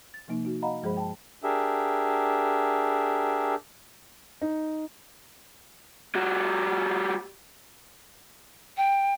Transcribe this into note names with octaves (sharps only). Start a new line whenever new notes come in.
A6
C3 F3 A#3 D#4
D#4 F#4
D#5 F5 F#5 A#5 B5
G2 F3 G#3 G#4 C5 B5
G5 A5
D4 G4 G#4 A#4 E5
D#4
G3 F#4
G5